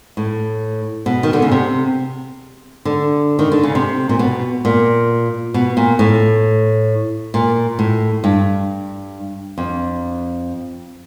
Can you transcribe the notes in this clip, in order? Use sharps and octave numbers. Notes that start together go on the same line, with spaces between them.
A2
B2
D#3
D3
C#3
C3
D3
D#3
D3
C#3
C3
A#2
B2
A#2
B2
A#2
A2
A#2
A2
G2
F2